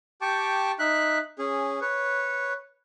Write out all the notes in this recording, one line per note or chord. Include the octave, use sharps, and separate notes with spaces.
G4 G5 A5 C#6 D6
D#4 E5 F#6
C#4 G#4
B4 C#5